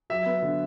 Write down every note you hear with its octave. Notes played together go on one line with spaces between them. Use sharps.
F#3 E5
B3
D3